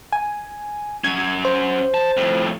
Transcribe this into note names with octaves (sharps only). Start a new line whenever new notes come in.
G#5
F#3 C#4 G#6
C5
A5
F2 A2